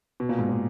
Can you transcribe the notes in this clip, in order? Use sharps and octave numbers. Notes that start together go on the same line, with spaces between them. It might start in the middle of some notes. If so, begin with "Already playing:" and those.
B2
A#2
G#2
A#2